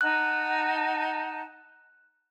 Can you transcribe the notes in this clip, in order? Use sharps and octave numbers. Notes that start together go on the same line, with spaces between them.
D#4 F#5 A5 F#6